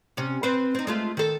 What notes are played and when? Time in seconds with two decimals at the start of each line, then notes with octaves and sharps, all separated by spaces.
0.17 C3 C#4
0.43 C4 B4 C5
0.75 C4 D#4
0.87 G#3 A3 F4
1.17 D#3 A4